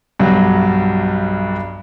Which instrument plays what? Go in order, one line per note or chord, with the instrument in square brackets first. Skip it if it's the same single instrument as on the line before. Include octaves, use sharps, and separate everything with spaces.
[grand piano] B1 G2 F#3 G3